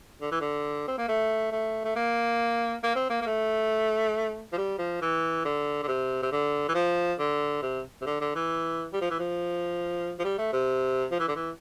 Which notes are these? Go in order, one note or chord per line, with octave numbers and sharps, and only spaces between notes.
D3
E3
D3
C4
A#3
A3
A3
A3
A#3
A#3
C4
A#3
A#3
A3
F3
G3
F3
E3
D3
D3
C3
C3
D3
E3
F3
D3
C3
C3
D3
D3
E3
G3
F3
E3
F3
F3
G3
A3
C3
F3
E3
D3
E3